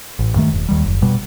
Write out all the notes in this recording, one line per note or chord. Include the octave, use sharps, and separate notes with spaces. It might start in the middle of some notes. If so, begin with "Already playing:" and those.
A1
G2 D#3 A3
E1
D#2 D#3 G3
F#1
B2 G3